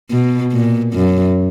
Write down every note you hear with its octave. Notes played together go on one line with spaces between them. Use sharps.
B2
A#2
F#2